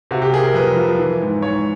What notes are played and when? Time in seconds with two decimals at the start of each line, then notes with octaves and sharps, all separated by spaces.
0.11 C3 F#4
0.22 G4
0.32 A#3 G#4
0.44 A#4
0.54 F2 B4
0.76 F3
0.98 E3
1.21 G#2
1.42 G#2 C#5